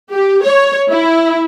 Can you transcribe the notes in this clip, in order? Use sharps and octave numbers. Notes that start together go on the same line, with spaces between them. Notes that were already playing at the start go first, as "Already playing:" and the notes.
G4
C#5
E4